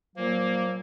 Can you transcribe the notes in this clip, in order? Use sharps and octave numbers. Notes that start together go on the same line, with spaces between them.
A#2 F3 F#3 A#3